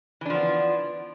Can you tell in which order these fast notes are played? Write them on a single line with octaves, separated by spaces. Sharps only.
E3 D4 F3 B3